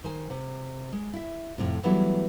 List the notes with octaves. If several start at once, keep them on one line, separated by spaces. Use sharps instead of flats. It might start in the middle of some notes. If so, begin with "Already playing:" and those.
D#3 C5 G#5
C3
G#3
E4 E5
F2 A2 C3
E3 F#3 G3 A3 B3 E4